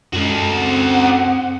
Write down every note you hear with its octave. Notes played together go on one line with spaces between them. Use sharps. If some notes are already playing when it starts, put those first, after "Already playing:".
F#2 G#3 F#4 A4
C4 F#5